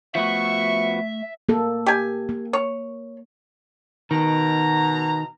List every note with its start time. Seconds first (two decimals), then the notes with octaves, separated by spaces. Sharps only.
0.15 F3 A3 B3 F#4 E5 C#6
1.49 A#3 A4
1.86 G4 G#5
2.29 A#3
2.53 C#5
4.11 B2 D#3 A#5